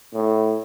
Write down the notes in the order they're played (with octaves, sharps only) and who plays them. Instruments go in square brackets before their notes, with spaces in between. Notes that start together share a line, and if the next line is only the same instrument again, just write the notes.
[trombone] A2